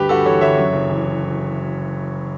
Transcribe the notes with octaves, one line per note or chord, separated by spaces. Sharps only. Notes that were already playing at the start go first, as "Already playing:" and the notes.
Already playing: D2 G2 G4 B4
G1 F#4 A4
E3 A4 C#5
G1 C#5 E5
F#2
F#1
E3